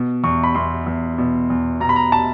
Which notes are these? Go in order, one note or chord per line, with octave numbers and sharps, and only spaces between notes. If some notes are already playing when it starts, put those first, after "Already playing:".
Already playing: B2
E2 C#6
B5
E2 C6
E2
B2
E2
B2 A#5
B5
A#5
A5